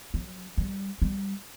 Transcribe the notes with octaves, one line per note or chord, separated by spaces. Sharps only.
F#3
G3
G3